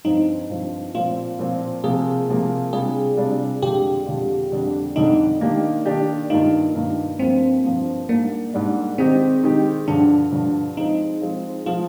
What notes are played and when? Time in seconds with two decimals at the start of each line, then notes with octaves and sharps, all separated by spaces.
0.05 G2 F3 C4 D#4 F4
0.50 G2 F3 C4 F4
0.95 A#2 F3 C4 F4
1.39 A#2 F3 C4
1.84 C3 F3 A#3 G#4
2.28 C3 F3 A#3
2.73 C3 G3 D4 F4 G#4
3.17 C3 G3 D4 F4
3.62 F2 D3 G#3 D4 F4 G4
4.07 F2 D3 G#3 D4 F4
4.52 F2 D3 G3 D4
4.96 F2 D3 G3 D4 D#4
5.41 D#3 A#3 D4 G4
5.86 D#3 A#3 D4 G4
6.30 G2 D#3 A#3 D#4 F4
6.75 G2 D#3 A#3 F4
7.19 G2 F3 A#3 C4
7.64 G2 F3 A#3
8.09 G#2 G3 A#3 D4
8.54 G#2 G3 D4
8.98 D#3 G#3 C4 D#4 G4
9.43 D#3 G#3 D#4 G4
9.88 G2 D3 F3 D4
10.32 G2 D3 F3
10.77 F3 G#3 C4 D#4 F4
11.21 F3 G#3 C4 F4
11.66 F3 G#3 F4